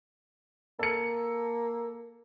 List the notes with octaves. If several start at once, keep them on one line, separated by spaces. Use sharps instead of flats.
A#3 A4 C#7